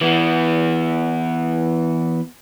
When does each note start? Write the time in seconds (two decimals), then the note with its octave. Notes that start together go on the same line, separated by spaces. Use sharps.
0.01 E3 B3